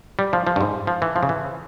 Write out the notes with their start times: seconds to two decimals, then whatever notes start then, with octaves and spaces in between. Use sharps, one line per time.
0.19 G3
0.33 F3
0.47 F3
0.56 G2
0.61 G#2
0.87 F3
1.02 E3
1.16 F3
1.23 C#3
1.29 E3